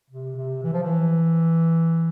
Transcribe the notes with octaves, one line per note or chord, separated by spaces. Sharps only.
C3
C3
E3
F3
E3